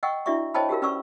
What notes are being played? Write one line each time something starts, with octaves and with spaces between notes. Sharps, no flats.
D#5 F#5 G5 C#6 E6
D4 E4 F#4 D5 E5 C#6
C5 C#5 D#5 G5 A5 B5
F#4 G4 A#4 F5
C#4 B4 D5 C#6 E6